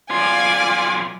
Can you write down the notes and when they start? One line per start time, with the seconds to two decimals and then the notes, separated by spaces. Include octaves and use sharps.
0.11 B1 F4 D5 G#5